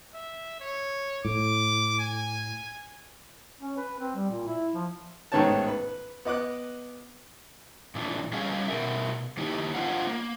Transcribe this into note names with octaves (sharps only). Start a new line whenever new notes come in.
E5
C#5
A2 D6
G#5
C#4
B4
C4
G3
A#2
E4
F3
A1 G#2 D#3 B3 C#5 A5
B4
B3 D#5 D6 F#6
A#2 E3 D4
G3 C#4 G#4 D#5 F5
B2 D#3 A#4 E5
D#3 A#3 D#4 E4 G4
D4 F4 C5 D#5 F5 F#5
A#3